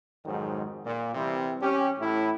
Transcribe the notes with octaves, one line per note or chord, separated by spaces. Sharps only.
F2 G#2 D#3 F#3
A#2
C3 E3 G3 C4
C#4 G4
A1 A2 E4